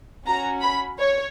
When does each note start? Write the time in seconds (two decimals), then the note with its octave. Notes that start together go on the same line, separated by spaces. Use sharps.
0.25 C#4 F#4 A#5
0.61 B5
0.99 C#5